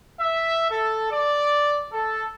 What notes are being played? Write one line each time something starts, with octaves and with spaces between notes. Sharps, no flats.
E5
A4
D5
A4